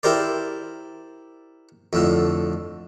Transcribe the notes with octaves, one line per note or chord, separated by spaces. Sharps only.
E4 G4 A#4 C5 D5
F2 A2 D3